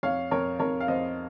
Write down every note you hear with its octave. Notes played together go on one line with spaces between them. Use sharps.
F2 C#5 F5
F2 A#4 C#5
F2 A#4 C#5
F5
F2 C5 D#5